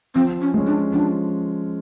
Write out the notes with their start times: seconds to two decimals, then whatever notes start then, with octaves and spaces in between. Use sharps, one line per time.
0.15 F3 C4
0.41 C#4
0.54 G#3 C#4
0.67 D4
0.93 F3 D4